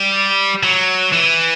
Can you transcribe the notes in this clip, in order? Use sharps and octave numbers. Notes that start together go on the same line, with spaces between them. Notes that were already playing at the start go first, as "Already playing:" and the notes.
Already playing: G3
F#3
E3